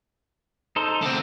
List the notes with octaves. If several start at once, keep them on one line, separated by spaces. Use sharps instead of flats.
D#4 A4 C5
D3 A3 C4